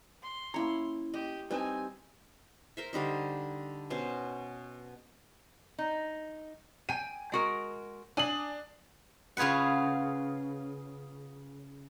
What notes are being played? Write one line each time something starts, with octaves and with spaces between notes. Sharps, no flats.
C6
A#3 C#4 E4 C#5 A#5
G4 D#5
G3 C4 D#4 B4 G#5 A5
A#4 C5 E5
D3 G3 D#4 C5
B2 C#4 C5
D#4
G5 G#5 D#7
G#3 F#4 A#4
D4 G#5 D#6 F#7
C#3 F4 G#4 B4 F#5